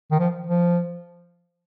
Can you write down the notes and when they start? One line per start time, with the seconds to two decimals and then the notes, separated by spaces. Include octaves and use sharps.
0.12 D#3
0.20 F3
0.47 F3